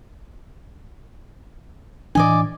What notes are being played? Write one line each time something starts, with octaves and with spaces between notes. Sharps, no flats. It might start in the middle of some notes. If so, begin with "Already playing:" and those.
A2 E3 D4 D5 D#5 G#5